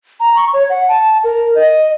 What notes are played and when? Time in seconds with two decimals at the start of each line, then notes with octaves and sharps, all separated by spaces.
0.20 A#5
0.36 C#6
0.53 C#5
0.70 F#5
0.89 A5
1.24 A#4
1.55 D#5